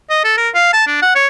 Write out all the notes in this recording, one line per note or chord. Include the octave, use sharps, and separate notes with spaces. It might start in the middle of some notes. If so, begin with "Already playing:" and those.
D#5
A4
A#4
F5
A5
D4
F#5
C#5